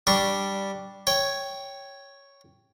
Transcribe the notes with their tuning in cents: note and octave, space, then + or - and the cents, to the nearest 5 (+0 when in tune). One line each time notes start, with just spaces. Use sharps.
G3 +0 D4 +0 C#6 +0
C#5 +0 G5 +0